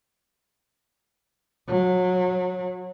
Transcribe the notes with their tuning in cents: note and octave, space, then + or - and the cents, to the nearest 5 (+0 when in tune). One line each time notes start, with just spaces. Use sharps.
F#3 -25